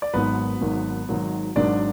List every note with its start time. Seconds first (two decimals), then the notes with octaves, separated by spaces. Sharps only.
0.02 D5
0.14 G#1 G#2 D#3 F#3 B3 B4
0.61 G#1 G#2 D#3 F#3
1.09 G#1 G#2 D#3 F#3
1.56 G#1 G#2 D#3 F#3 D4 D5